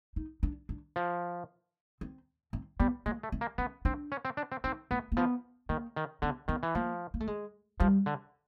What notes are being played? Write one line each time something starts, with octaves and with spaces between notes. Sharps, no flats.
D#4
D4
D4
F3
C4
C4
G3 B3
G#3 A#3
A3
C4
A#3
B3 C#4
C4 D4
C#4
C4
D4
C4
C4 D#4
A#3 B3
A#3
F3 B3
D#3 A#3
D#3
D3 B3
D#3 B3
E3
F3 A#3
A#3
A3
G#3
F3 G3
D3